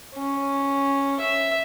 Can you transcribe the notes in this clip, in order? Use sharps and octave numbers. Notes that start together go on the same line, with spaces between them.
C#4
E5